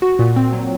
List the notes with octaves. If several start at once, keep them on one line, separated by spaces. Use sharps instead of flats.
F#4
A#2
C4
F#3